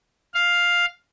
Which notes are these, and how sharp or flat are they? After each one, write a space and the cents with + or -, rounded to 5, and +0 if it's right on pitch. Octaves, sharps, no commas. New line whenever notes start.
F5 +5